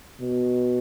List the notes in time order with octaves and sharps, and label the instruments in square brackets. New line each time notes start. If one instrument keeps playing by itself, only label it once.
[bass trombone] B2